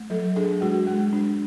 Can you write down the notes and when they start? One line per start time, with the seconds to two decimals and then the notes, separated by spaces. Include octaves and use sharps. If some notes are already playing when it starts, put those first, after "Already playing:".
Already playing: A3
0.10 F#3 A4
0.36 D4 G#4
0.61 G#3 F#4
0.87 G#3
1.13 D4